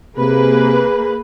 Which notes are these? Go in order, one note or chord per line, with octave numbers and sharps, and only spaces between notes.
C3 A#3 G#4 B4